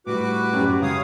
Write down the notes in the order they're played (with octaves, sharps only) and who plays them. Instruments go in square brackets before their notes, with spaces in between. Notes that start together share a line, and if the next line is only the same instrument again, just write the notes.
[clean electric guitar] A2 G3 [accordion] F#4 B4 D6
[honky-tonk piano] F#2 G4
[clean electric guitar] C#3 G#3 [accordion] C#5 F5 D#6